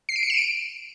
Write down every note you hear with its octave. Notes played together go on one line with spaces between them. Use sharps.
C7
D7
C#7
E7
D7